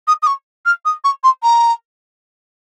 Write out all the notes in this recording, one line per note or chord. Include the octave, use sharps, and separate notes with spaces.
D#6
D#6
C#6
F6
D#6
C#6
C6
A#5